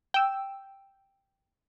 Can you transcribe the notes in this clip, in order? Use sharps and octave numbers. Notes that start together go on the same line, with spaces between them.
G5 E6